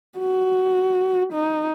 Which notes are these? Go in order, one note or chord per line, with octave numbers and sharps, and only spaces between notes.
F#4
D#4